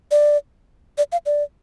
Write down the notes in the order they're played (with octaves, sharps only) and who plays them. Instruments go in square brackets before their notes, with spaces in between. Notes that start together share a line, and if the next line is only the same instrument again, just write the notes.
[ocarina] D5
D5
F5
D5